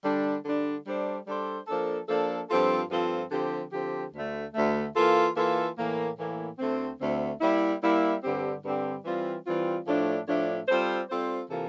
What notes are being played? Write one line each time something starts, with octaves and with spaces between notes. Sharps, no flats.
D3 G3 D4
D3 G3 D4
G3 D4 A4 C5
G3 D4 A4 C5
F3 A#3 D4 A4
F3 A#3 D4 A4
G2 F3 C4 F4 A4
G2 F3 C4 F4 A4
D3 F3 C4 G4
D3 F3 C4 G4
D2 D3 A3
D2 D3 A3
E3 A#3 F4 A4
E3 A#3 F4 A4
A2 E3 A#3
A2 E3 A#3
D2 D3 A3 C4
D2 D3 A3 C4
G3 A#3 E4
G3 A#3 E4
G2 D3 G3 C4 G4
G2 D3 G3 C4 G4
E3 G3 C4 F4
E3 G3 C4 F4
A2 F3 A3 D4
A2 F3 A3 D4
G3 C4 F4 A4 C5
G3 C4 F4 A4 C5
C3 E3 A#3 F4 A4